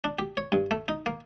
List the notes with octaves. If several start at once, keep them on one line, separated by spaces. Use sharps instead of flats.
D4
G4
C#5
G2
A3
D#4
A#3